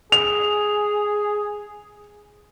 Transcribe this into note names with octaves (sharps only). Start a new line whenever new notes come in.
G#4 F7